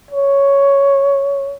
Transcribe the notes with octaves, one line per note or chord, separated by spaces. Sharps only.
C#5